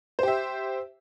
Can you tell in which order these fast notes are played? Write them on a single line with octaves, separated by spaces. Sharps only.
C5 G4 E5